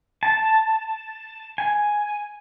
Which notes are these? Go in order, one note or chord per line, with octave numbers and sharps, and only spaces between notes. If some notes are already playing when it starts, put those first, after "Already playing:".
A5
G#5